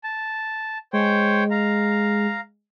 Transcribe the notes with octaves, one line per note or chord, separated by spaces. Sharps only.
A5
G#3 C5 C#5 G5
F5 A#5